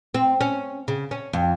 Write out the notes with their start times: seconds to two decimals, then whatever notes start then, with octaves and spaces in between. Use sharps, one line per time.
0.14 C4
0.41 C#4
0.88 C#3
1.11 C#4
1.33 F2